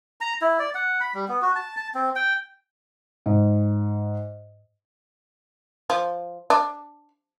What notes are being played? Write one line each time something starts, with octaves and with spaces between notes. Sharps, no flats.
A#5
E4
D5
F#5
B5
G3
B3
F#4
A5
A5
C4
G5
G#2
F3
D4